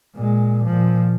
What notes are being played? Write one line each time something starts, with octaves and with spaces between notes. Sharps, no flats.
A#2 G#3
A#2 F3